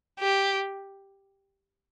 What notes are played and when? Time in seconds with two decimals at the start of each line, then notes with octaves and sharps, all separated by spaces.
0.20 G4